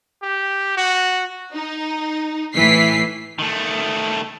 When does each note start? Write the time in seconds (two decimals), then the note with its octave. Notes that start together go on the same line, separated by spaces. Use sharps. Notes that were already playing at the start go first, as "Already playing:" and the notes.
0.23 G4
0.77 F#4
1.53 D#4
2.54 A2 E3 B6 C7
3.39 D#3 A3